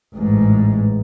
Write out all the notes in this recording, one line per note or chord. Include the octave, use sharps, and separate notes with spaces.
A1 G#2